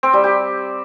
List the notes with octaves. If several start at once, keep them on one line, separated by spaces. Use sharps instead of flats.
C4
G3
G4